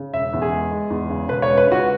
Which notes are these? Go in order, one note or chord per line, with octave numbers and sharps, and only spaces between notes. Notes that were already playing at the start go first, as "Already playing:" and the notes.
Already playing: C#3
E1 E5
E2
G#4
G#3
G#3
E2
C#3
E1 B4
C#5
G#3
B4
C#3 F#4